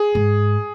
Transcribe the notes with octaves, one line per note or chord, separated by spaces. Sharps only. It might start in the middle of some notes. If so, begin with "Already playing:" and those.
Already playing: G#4
G#2